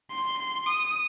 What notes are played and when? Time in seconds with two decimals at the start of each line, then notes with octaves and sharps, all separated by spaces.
0.10 C6
0.38 C6
0.66 D#6